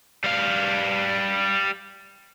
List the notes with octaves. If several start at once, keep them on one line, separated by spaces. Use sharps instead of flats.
G3 F5